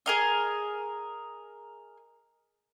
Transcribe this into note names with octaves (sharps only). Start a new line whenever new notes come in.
G#4 A#4 D#5